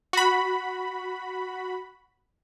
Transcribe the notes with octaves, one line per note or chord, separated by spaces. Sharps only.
F#4 B5